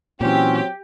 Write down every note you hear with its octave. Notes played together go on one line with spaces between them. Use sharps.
A#2 E3 F#3 C4 C#4 G4